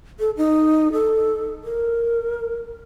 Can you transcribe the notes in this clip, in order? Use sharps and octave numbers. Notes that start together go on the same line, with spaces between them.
A4
D#4
A4
A#4